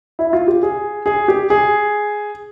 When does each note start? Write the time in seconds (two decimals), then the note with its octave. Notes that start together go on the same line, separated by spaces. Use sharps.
0.19 E4
0.33 F4
0.48 G4
0.63 G#4
1.06 G#4
1.28 G4
1.50 G#4